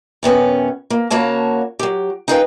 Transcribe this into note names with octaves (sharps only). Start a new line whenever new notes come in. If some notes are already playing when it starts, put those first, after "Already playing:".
F#2 C3 B3 C#4
A#3
C#3 A#3 F#4 C#5 A5
F#3 G4
D#4 E4 G#4 B4 F5 G5